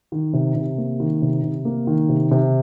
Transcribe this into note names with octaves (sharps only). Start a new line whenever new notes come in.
D#3
C3
C3
A#3
D#3
C3
C3
A#3
D#3
C3
C3